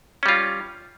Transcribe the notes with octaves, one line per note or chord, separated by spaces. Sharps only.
G3 C#4 F4